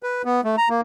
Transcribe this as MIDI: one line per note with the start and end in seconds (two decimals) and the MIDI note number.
0.03 0.22 71
0.25 0.41 59
0.44 0.56 57
0.58 0.69 82
0.69 0.81 58